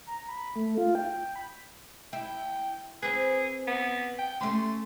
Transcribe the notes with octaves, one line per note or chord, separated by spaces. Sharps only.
A#5
B5
A3
F4
G5
B5
E4 G5
C4 G#4 B4
B3
G5
A3 C#4 G4 C6